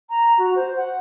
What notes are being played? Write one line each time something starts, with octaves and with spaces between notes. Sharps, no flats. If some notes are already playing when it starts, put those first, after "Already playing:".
A#5
F#4
C5
F#5